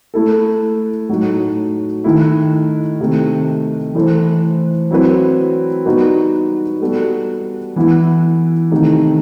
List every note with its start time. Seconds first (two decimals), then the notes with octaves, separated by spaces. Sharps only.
0.14 A3 E4 A4
1.09 A2 F#3 A3 D#4 F#4
2.04 D#3 A3 E4
3.00 C3 D#3 A3
3.95 E3 A3 E4 A4 C5
4.90 F#3 C4 E4 B4
5.85 B2 G3 D#4 F#4 B4
6.82 G3 B3 F#4 A4
7.76 E3 B3 E4
8.71 C3 D#3 A3 D#4